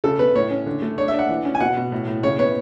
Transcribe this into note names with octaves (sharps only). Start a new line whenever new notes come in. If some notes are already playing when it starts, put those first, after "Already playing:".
C#3 A4
B3 B4
A2 C#5
C#4
D3
A3
D4 C#5
E5
D4
F#5
E3
C#4
G#5
B2 F#5
B2
A2
A2
C#3 C#5
B3 C#5